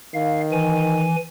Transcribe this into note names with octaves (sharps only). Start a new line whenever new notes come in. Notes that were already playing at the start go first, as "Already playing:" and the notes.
D#3 F5
E3 G#5